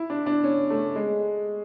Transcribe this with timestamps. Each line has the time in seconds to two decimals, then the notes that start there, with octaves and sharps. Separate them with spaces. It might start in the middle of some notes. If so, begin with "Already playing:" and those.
Already playing: E4
0.10 D4
0.26 D4
0.44 C#4
0.70 A3
0.95 G#3